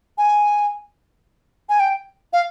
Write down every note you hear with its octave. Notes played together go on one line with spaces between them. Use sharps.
G#5
G#5
G5
F5